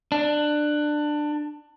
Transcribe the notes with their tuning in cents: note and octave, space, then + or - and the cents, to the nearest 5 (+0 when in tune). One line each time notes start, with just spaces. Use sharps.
D4 +20